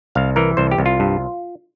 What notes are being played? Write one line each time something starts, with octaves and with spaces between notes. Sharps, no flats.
C2 F5
E3 A#4
C2 C5
G4
C2
F4
G2